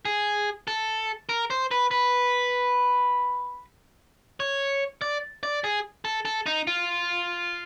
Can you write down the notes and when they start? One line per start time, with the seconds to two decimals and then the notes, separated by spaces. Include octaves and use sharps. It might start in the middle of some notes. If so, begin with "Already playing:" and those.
0.05 G#4
0.68 A4
1.29 A#4
1.50 C5
1.71 B4
1.91 B4
4.40 C#5
5.02 D5
5.43 D5
5.64 G#4
6.05 A4
6.25 A4
6.46 D#4
6.67 F4